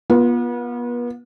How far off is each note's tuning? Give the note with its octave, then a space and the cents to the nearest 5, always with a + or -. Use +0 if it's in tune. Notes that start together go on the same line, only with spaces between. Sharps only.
B3 -35 F4 +0